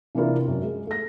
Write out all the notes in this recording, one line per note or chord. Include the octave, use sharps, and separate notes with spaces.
C3 E3 A#3 D4 F4 A#4
F#2
G#3
A3 A#6